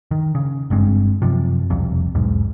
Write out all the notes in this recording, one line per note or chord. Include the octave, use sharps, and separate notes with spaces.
D#3
C#3
G1 G2 G#3 C4
F#2 C3 F3
E1 C2 F2 C3
B1 E2 G#2 G#3